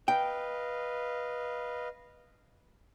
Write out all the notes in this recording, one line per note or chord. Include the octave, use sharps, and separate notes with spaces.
B4 D#5 F5 G5